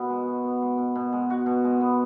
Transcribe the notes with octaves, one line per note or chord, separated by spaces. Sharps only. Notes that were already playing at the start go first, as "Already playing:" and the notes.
Already playing: B2 B3 F#4
G#3
F#4
B3
G#3
B2
B2
G#3
F#4
B2
G#3
B3